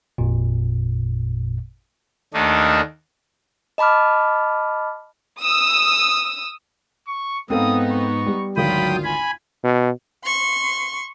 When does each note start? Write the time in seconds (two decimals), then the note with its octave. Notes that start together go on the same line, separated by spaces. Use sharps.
0.18 G#1 F2 A#2
2.34 D#2 D#3 A3 D4 D#4
3.78 D#5 A5 B5 D6 F6
5.39 D#6 E6
7.07 C#6
7.50 G#2 B3 C4 D#4 A4 F5 D#6
7.92 C#6
8.26 G3
8.57 G#1 D2 F#3 F4 G5 B5 D#6
9.04 G#5 B5 G#6
9.64 B2
10.24 C6 C#6